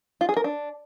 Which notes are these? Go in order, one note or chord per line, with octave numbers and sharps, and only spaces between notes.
F4
G#4
A#4
D4